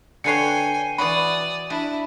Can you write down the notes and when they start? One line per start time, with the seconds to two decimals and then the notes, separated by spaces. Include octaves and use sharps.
0.24 D3 B4 C#5 G5 G#5 C7 C#7
0.98 E3 F#4 D5 B5 D#6
1.70 D4 E4